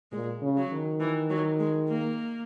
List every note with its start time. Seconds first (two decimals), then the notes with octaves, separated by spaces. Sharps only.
0.12 A#2 G#3
0.42 C#3
0.57 F#3
0.71 D#3
1.00 E3
1.29 F#3
1.59 G#3
1.88 A#3